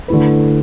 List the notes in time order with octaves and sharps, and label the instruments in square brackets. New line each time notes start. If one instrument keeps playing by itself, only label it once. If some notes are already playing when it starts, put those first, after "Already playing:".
[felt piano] D3 A3 E4 B4